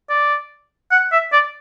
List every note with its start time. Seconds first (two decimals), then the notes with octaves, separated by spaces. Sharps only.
0.10 D5
0.91 F#5
1.12 E5
1.33 D5